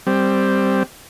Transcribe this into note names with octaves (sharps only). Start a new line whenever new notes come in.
G3 C4